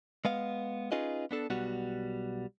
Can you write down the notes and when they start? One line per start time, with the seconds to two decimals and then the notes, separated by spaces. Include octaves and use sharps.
0.25 G#3 B3 F5
0.92 C#4 D#4 F4 G#4 B4 D#5
1.31 B3 D4 A4
1.50 B1 G3 B3 F#4